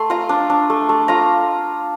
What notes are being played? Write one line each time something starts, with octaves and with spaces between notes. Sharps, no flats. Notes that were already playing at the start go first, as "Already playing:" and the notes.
Already playing: A3 C6
F4 A#5
D4
D4
A3
A3
F4 A#5